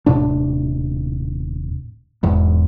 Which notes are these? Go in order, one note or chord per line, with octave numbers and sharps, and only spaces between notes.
D#1 A2 C3 D4
E1 E2 G#2